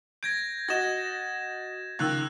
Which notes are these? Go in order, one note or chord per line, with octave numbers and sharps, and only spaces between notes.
G6 G#6 A#6 D7
F#4 D#5 A6 E7
C#2 D#3 E6 F#6 A6